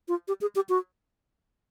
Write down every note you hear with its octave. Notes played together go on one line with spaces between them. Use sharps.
F4
G4
G#4
G4
F#4